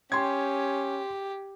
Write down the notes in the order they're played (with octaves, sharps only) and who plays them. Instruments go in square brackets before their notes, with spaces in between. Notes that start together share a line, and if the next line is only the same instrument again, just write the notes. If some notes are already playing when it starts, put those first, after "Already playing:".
[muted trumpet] C#4 [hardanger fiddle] G4 [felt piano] G5 C6 G#6